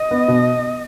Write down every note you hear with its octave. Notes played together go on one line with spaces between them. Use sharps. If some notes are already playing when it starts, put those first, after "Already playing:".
Already playing: D#5
B3
B2